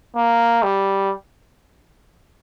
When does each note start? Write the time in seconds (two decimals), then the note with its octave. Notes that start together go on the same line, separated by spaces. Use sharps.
0.16 A#3
0.63 G3